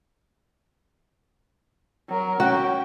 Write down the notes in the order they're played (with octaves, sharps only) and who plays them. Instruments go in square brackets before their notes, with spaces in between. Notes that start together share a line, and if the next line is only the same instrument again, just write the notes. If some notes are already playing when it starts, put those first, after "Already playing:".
[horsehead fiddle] F#3 A#4
[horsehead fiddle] C#4 G5 [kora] F#4